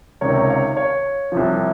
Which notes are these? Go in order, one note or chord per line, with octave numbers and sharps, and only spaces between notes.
C#2 C3 D#3 A#4 C#5
A#4 C#5
C#5 F5
C#5 F5
C2 C3 F3